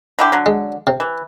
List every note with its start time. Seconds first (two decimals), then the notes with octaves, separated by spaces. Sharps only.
0.19 D3 E4 G4
0.32 D3 F#3
0.46 G#3
0.87 C3
1.00 E3